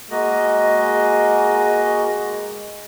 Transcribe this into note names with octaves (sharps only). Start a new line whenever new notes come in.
G#3 A#3 F#4 D#5